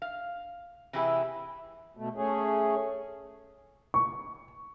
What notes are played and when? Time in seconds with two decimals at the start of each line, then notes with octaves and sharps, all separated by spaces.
0.02 F5
0.93 C3 E3 E4 G4 G#4
1.97 B2 A3
2.16 A3 C#4 G#4
3.94 C#6